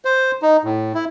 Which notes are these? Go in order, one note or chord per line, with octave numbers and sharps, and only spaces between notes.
C5
D#4
A2
E4